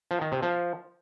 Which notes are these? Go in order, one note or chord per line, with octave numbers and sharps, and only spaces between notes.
F3
D#3
C3
F3